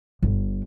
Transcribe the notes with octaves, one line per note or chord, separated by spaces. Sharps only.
G1